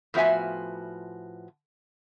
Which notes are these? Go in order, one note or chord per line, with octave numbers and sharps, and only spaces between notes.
A2 F3 B3 F#4 E5 G#5